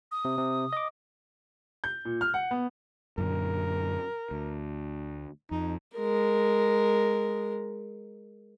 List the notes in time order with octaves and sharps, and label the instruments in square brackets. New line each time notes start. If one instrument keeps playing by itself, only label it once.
[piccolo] D#6
[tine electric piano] C3
C3
D#5 D6
[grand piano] G6
A#2
F6
F#5
B3
[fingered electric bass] F#2 A#2 D3 [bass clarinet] A#4
[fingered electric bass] D2
[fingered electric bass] F2 [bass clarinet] D#4
[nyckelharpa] G#3 A#4